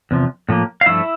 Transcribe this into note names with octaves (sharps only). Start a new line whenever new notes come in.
E2 C3 F3
A2 F3 A#3
F5
G2 F3 A3 E4 E5